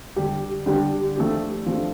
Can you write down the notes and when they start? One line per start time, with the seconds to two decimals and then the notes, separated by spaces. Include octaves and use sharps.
0.16 D3 G3 D4 G4
0.66 D3 G3 D4 G4
1.16 F3 A3 D4 G4
1.66 F3 A3 D4 G4